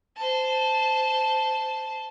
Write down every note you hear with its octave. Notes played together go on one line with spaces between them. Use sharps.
C5 A5